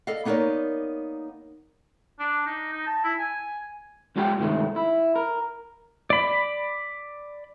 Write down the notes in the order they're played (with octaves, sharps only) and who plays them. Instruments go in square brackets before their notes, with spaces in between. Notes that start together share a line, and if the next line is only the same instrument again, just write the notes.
[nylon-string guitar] A4 D5 D#5 F5
A#3 B3 D#4 A#4 C#5 D5
[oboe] D4
D#4
D#4
A5
E4
G#5
[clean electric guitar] B1 G#3 F4 G4 E5 G5
G2 C3 D#3 G#3 A3
E4
A#4
[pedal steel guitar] D5 B5